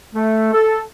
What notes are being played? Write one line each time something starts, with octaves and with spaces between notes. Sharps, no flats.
A3
A4